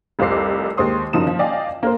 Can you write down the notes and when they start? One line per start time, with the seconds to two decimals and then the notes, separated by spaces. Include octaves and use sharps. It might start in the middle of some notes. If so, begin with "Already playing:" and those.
0.19 F1 C2 F4 C5 D6 C7
0.77 D#2 G#3 C5 C6 D#6
1.13 F#1 F#2 F3 D#4 D#6 E7
1.27 F3
1.39 D5 D#5 F5 G5 G#5
1.83 A#3 A#4 C5